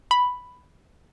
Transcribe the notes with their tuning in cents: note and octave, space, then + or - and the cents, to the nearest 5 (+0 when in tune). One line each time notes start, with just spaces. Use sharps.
B5 +0